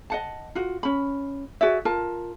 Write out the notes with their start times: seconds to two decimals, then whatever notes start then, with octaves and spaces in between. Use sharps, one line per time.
0.10 D#5 F#5 A5
0.55 F4 F#4
0.83 C#4 B5
1.61 F#4 G#4 D5 E5
1.85 F4 A#4 A5